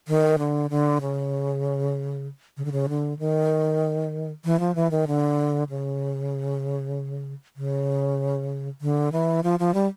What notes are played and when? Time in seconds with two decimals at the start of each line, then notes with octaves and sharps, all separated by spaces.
0.08 D#3
0.38 D3
0.70 D3
1.01 C#3
2.57 C#3
2.65 D3
2.72 C#3
2.89 D3
3.19 D#3
4.45 E3
4.60 F3
4.75 E3
4.91 D#3
5.07 D3
5.69 C#3
7.56 C#3
8.81 D3
9.12 E3
9.44 F3
9.59 F3
9.74 G3